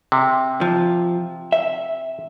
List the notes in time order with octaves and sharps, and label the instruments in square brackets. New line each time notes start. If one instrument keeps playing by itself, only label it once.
[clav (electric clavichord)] C3
[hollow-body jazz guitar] F3
E5